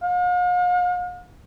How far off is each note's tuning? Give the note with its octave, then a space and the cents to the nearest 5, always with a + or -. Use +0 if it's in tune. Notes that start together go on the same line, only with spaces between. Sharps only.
F5 +45